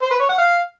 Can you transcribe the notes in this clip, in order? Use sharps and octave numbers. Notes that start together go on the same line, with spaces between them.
C5
B4
C#5
F#5
F5